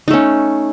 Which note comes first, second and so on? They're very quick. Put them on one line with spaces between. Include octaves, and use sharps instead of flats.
D#4 A3 C#4